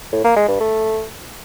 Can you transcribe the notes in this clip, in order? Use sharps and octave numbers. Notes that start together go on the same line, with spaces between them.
A2
A#3
G#3
G2
A3